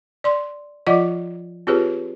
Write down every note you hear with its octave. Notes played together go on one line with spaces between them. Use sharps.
D5 C6
F3 F4 D5 D#5 F#5 D6
C4 F4 G4 G#4 B4 C#5